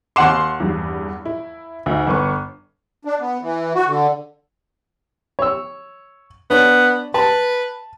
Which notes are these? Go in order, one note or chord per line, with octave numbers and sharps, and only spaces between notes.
D#2 F#5 C6 D6 C7 E7
E2 G2
E4
D2 D#4
G1 B3 C#6
D4
B3
E3
F#4
D3
C#5 E6
B3 D4 C#5
B4 A5